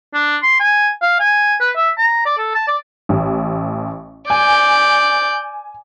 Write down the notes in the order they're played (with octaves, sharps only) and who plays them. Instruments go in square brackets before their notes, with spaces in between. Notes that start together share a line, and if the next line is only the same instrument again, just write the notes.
[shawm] D4
C6
G#5
F5
G#5
B4
E5
A#5
D5
A4
A5
D5
[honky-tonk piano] A1
[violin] D5 G6 [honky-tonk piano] G#5